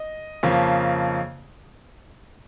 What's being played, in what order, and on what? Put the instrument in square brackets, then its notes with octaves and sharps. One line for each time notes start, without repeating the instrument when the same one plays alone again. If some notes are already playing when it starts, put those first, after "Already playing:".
Already playing: [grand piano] D#5
F2 C#3 F3 A#3